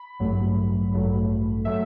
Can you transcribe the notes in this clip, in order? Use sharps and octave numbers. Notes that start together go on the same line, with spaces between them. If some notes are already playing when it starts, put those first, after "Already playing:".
Already playing: B5
A1 G2 F#3 A3
A1 G2 F#3 A3
F#3 A3 E5